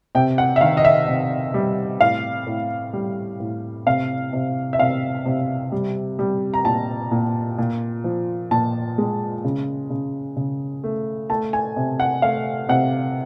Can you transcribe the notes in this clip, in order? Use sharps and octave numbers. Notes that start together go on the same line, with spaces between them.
C3 G5
F#5
E5
D#3 F5
D#5
E5
C3
G3
A2 F5
A2
G3
A2
C3 F5
C3
E5
C3 F5
C3
G3
G3
A#5
A#2 A5
A#2
A#2
F3
A#2 A5
G#3
C#3
C#3
C#3
A3
A3 A5
G#5
C3
F#5
A3 F5
C3 F#5